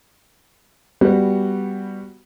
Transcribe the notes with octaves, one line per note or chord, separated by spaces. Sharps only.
G3 B3 F#4